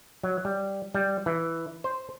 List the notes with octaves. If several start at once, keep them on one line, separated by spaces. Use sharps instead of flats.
F#3
G3
G3
E3
C5